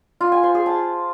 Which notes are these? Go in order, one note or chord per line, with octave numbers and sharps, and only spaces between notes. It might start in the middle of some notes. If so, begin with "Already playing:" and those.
F4
G#5
C5
G#4
A5